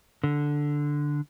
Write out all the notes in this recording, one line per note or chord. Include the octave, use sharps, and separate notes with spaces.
D3